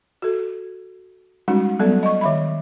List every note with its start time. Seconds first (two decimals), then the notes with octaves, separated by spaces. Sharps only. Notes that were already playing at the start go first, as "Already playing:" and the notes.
0.22 F#4 A4
1.48 G3 G#3 C#4 D#4 F#4
1.79 F#3 G3 B3 A4 D5
2.03 D#5 C#6
2.21 D#3 E5 B5